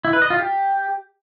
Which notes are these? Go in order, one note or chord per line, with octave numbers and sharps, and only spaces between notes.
E4
B4
D#5
F4
G4